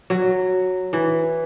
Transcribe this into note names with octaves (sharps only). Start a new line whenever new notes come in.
F#3
E3